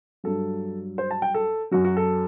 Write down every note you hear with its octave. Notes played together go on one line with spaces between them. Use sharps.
G2 F#3 A4
C5
A5
G5
A4
F#2 F#3 F#4
F#4
A4